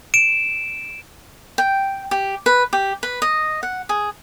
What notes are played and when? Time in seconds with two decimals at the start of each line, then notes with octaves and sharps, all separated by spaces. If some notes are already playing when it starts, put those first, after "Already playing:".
0.14 D7 E7
1.58 G5
2.11 G4
2.46 B4
2.73 G4
3.03 B4
3.22 D#5
3.63 F#5
3.89 G#4